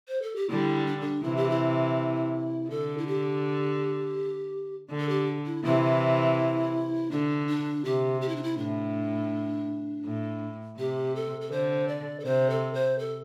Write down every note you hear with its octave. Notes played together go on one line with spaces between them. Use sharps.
C5
A4
G4
D3 G3 E4
D4
D4
C3 E3 E4
G4
E4
D3 A4
E4
G4
D3
A4
G4
E4
C3 E3 E4
D3 D4
D4
C3 G4
G4
E4
D4
E4
A2 D4
A2
C3 G4
A4
A4
D3 C5
D5
A4
C3 C5
A4
C5
A4